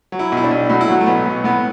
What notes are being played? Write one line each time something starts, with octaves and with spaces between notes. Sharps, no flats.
F#3
E4
B1
E4
D4
B1
A2 F#4
E4
F#3 F#4
A3
B1 B3
B1
A2 B3